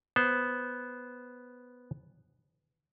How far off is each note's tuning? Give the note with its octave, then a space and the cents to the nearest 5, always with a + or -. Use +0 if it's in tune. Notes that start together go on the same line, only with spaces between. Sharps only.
B3 +0 C5 +0